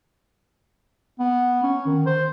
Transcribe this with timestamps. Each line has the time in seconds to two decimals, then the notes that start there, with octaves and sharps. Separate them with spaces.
1.19 B3
1.63 C#4
1.86 D#3
2.06 C5